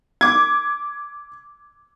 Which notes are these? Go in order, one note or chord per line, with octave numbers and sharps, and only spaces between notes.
D6 G#6